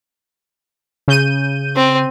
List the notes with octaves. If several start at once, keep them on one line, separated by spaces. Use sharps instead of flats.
C#3 G6 D#7
C4